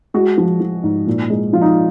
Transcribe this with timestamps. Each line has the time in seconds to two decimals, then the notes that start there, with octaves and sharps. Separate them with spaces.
0.14 G#3 F#4
0.38 F3
0.60 F3
0.84 G#2
1.07 A#2
1.30 G#3
1.53 F3 F4
1.61 D#4